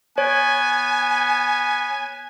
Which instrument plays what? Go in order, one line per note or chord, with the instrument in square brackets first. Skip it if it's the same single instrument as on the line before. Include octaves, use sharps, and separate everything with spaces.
[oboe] B3 [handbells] C#5 [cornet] G#5